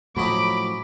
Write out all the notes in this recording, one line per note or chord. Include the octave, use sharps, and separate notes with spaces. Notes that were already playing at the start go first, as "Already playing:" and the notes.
A2 F3 F#3 C#4 D#5 B5 D6